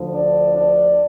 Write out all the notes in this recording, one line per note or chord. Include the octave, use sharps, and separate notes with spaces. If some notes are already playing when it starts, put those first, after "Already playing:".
Already playing: D2 D3 F3
D4
D4